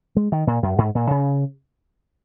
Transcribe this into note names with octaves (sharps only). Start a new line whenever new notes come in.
G#3
D#3
A#2
F#2
G#2
A#2
C#3